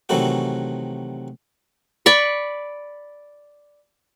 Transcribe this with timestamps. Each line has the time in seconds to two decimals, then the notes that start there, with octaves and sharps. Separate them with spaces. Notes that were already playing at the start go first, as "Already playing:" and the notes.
0.09 C3 D#3 E3 F#3 A3 F#4
2.06 D5 B5 C#6